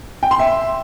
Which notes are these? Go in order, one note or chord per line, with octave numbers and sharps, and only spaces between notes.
G5
C6
E5